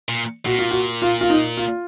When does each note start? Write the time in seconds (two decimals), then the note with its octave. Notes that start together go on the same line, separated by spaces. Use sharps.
0.09 A#2
0.46 A#2 F#4
0.59 F4
0.71 F#4
1.02 F4
1.21 F4
1.30 D#4
1.57 F4